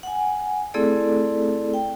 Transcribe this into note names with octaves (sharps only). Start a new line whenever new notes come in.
F#5 G#5
A3 C4 E4 G#4 A4 D5
G5